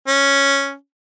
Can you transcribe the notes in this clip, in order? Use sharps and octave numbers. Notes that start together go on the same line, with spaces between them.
C#4